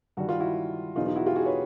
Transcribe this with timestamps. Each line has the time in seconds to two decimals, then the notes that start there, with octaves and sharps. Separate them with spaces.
0.17 G2 D#3 G3 F#4
0.29 F4
0.40 E4 F#4
0.96 E2 B2 F#3 D#4 F4
1.06 D#4 F4
1.16 E4 F#4
1.26 F4 G4
1.36 F#4 G#4
1.45 B4 C#5